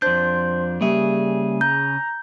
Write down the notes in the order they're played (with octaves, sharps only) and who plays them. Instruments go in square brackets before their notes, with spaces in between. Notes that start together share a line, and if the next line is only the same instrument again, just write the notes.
[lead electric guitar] F2 D4 [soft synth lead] C5 [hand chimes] G6
[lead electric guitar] C#3 G#4 [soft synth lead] G3 [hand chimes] A#3 E5
[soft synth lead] A#5 [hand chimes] G6